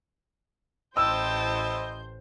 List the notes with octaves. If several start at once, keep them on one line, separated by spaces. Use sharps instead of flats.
A1 E4 C5 D#5 G5 A5 E6 G6